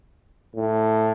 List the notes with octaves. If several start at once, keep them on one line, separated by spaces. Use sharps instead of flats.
A2